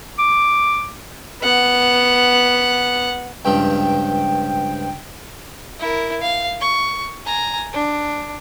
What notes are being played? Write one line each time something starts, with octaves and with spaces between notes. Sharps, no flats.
D6
B3 F#5
C#2 G2 F3 G5
E4 A#4
F5
C#6
G#5 A#5
D4